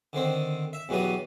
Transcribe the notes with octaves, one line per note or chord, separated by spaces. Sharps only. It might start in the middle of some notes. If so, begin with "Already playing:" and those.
D3 D#3 C4
E5
E2 B2 F#3 G3 D#6